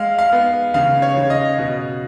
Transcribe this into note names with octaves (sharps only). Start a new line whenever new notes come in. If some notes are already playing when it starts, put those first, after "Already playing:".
Already playing: G#3 F5
F5
B3
C#3 F5
C#5
C#3
D#5
B2